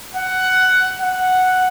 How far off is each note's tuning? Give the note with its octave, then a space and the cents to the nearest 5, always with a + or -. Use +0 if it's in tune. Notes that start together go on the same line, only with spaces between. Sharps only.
F#5 +10
F#5 +0